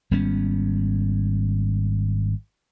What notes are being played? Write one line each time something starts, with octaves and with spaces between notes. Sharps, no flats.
G#1 G3 B3 C#4